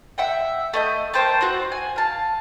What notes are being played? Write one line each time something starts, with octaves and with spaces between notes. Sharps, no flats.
E5 F#5 G5
A3 D#5 G6
A#4 C5 G5 A5
C4 F#4 C5
G#5
F5 A5